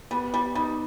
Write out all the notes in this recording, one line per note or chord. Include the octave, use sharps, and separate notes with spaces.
G3 B3
G3
G3 D#4